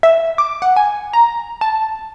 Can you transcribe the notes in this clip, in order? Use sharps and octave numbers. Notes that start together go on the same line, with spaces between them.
E5
D6
F#5
G#5
A#5
A5